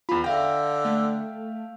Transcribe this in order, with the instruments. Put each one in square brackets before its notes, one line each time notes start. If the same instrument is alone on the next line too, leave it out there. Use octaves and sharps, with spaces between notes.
[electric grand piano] E2 B5 [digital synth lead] F4
[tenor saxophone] D3 [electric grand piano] E5 F5 G5 [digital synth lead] A#6
[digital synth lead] A3